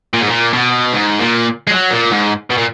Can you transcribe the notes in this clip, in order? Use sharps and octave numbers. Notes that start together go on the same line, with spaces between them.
A#2
G#2
A#2
B2
G#2
A#2
G#3
F#3
A#2
G#2
B2
A#2